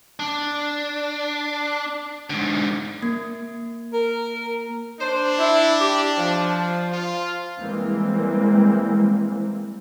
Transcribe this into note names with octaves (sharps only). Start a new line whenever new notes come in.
D4
G#2 D3
A#3
A#4
D4 C5
E4
G4
F3
F4
E3 G3 G#3 A#3 C4